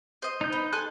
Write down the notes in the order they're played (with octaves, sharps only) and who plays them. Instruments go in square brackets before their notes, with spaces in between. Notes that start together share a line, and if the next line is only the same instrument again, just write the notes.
[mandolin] C5 D#5
[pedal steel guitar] D#4 G6
[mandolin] B3
[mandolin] A4 G#5 C6 [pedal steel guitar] F#6